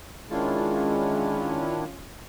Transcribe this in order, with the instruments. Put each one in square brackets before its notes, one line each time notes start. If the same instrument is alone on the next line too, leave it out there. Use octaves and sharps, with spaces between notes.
[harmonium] D#3 D4 E4 [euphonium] G#3 [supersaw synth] C#4 F4